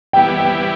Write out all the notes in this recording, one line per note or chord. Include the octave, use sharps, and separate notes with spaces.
E3 G3 B3 E4 G4 G5
G5